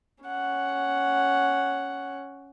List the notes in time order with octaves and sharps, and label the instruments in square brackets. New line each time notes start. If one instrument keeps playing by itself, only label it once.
[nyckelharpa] C#4 F#5